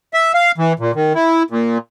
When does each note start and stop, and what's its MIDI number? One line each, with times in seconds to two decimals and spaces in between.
0.14 0.32 76
0.34 0.52 77
0.58 0.73 52
0.79 0.92 46
0.95 1.13 51
1.15 1.43 64
1.50 1.78 46